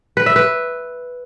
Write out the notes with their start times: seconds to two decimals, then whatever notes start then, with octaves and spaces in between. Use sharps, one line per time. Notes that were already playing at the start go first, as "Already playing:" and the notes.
0.17 B4
0.26 E5
0.36 B4